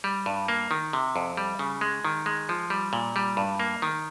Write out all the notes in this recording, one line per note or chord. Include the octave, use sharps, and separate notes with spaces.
G3
G2
A#3
D#3
C3
F2
G3
C#3
G#3
D#3
G#3
F3
G3
A#2
G3
G2
A#3
D#3